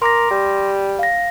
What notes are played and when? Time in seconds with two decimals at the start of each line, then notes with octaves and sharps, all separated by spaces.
0.02 A#4 C6 D6 A#6
0.31 G3
0.99 F5 A#6